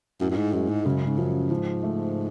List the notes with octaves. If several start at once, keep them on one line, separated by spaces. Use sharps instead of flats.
F#2 A2
F#2
G#2
F#2 G#3
G#2
F#2 C#3
G#2
F#2 F3
G#2 F3
A3